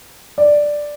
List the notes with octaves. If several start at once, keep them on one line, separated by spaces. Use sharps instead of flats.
D5